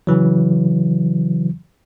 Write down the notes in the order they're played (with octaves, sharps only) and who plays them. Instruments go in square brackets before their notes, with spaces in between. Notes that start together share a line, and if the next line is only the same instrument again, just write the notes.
[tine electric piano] C#3 E3 F#3